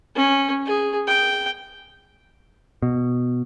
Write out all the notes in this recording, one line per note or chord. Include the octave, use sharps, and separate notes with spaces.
C#4
G#4
G5
B2